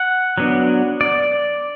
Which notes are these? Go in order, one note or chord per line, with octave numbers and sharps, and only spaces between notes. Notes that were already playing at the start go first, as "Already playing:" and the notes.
Already playing: F#5
F#3 B3 D4
D5